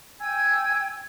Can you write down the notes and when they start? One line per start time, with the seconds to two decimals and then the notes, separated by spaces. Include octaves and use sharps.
0.19 G5 G#5 E6 G#6